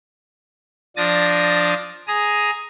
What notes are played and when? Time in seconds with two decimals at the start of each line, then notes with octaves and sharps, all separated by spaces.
0.97 F3 D4 D#6 A6 A#6
2.08 G#4 A#5 D#6